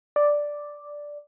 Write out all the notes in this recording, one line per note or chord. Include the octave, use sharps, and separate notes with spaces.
D5